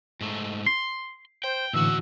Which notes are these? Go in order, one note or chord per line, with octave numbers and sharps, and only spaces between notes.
G#2 A3
C6 C7
C5 G5
D#2 A2 D3 E3 F#4 E6